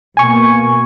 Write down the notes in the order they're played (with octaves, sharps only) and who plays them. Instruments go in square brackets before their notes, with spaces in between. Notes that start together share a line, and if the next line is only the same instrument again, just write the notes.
[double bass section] B2 A#3 [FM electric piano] G#5 C#6